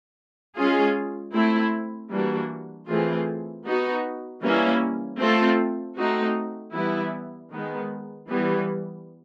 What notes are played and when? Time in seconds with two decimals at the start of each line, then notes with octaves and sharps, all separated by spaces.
0.55 G#3 C#4 F4 G#4
1.32 A3 C4 E4
2.10 E3 G3 A#3 D4 F#4
2.87 E3 A3 C4 F4 G#4
3.64 B3 D#4 F#4
4.41 E3 G3 A#3 C#4 E4
5.19 A3 C4 F4 A4
5.96 A3 C4 D#4 F#4
6.73 E3 G3 B3 E4
7.51 D#3 G#3 B3
8.28 E3 G3 B3